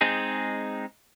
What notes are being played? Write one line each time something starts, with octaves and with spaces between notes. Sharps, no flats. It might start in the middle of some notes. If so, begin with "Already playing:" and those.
G#3 C4 D#4 G#4